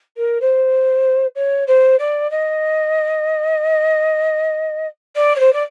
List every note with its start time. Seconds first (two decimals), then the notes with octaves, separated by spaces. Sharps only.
0.17 A#4
0.41 C5
1.35 C#5
1.67 C5
1.99 D5
2.30 D#5
5.15 D5
5.35 C#5
5.39 C5
5.53 D5